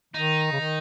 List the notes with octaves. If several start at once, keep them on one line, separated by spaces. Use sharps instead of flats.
D#3 D#4
C#3
D#3